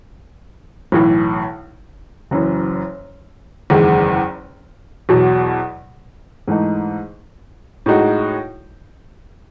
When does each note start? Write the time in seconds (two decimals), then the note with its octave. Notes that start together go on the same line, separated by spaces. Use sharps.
0.92 B1 A2 E3
2.31 F#1 F#2 E3
3.70 F#1 E2 D#3 G#3
5.09 E2 B2 F#3
6.48 G#2 E3 A3 D#4
7.86 A2 G#3 D#4 F#4